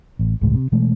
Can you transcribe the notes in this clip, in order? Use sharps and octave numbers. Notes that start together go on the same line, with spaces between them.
A1
G1 C#2 A2 G#3
C3
B2 E3 G#3 A3